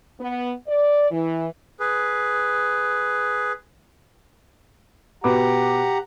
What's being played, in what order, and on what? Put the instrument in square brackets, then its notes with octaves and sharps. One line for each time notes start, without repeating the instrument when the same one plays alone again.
[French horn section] B3
D5
E3
[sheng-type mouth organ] G#4 B4
[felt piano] B2 B4 D6 [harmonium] G4 F#5 A#5